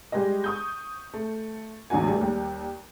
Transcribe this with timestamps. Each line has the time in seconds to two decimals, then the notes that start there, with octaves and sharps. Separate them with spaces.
0.12 G3 G#3 G4 G#4 D#5
0.44 C#6 D#6 G6
1.14 A3
1.90 A1 E2 D3 D#4 F#4 G#5
2.08 G3 A3
2.21 D#2 G3